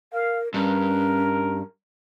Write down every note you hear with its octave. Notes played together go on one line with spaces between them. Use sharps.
A#4 F5
G2 C#4 A#4